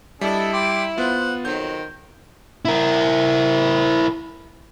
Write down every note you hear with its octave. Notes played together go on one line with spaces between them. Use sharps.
G3 D4 E4 A4 D#5
G5 C6 D6
B3 F4 C5 F#5
F2 D#3 F#3 C5 G6
E4 A#4